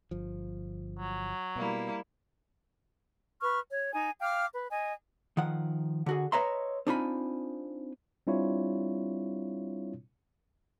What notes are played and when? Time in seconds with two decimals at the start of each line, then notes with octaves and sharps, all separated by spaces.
0.11 G1 F3
0.98 F#3
1.56 B2 G3 A#3 E4
3.42 B4 C#6 F6
3.71 C#5
3.93 D#4 G#5
4.21 F5 G5 D6 F6
4.54 B4
4.71 D#5 G#5
5.37 D#3 F3 F#5
6.06 D3 F#4 G#4
6.32 B4 C#5 D#5 E5 A#5 C6
6.87 C4 D4 D#4 F4 G#5 B5
8.27 G3 C4 D4 E4 F4 C#5